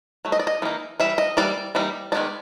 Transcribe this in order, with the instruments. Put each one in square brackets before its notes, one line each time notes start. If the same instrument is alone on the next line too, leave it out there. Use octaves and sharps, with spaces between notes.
[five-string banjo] F#3 A3
D#5
D5
D#5
E3 G3 A#3 D#4
E3 G3 E5
D#5
E3 G3 A#3 D5
E3 G3 A#3 D#4
D#3 G#3 B3 D#4 D5